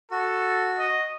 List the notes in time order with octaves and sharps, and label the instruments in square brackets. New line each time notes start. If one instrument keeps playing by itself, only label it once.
[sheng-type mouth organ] F#4 [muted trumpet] A4
[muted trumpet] D#5